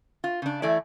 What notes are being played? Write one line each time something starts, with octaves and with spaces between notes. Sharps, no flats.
F4
C#3 D4
E3 A3 E4 D5